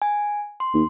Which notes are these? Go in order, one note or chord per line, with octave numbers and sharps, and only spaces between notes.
G#5
C6
D#2